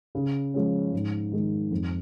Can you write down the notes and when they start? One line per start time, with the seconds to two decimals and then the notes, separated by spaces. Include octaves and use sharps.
0.15 C#3
0.54 F3 G#3 C#4
0.93 G#2
1.32 D#3 G#3
1.71 F2